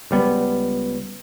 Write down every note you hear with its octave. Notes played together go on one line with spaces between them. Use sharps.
C#2 G3 B3